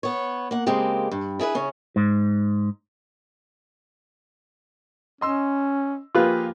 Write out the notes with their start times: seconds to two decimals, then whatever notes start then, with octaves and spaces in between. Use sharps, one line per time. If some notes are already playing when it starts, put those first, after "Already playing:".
0.03 B3 C#5
0.51 A#3 F#5
0.66 C#3 G#3 A#3 C4 G4
1.12 G2
1.39 E4 G#4 A#4 B4
1.55 C#3 C#4
1.96 G#2
5.21 C#4 D#5 C6 E6
6.15 F3 A#3 F4 G4 G#4 B4